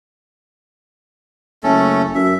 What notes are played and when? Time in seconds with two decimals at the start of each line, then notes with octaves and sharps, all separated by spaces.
1.63 F#1 A3 C#4 A4
2.15 F#2 E5